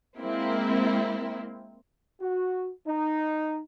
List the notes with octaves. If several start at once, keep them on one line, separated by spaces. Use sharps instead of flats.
G#3 A#3 C4 E4
F#4
D#4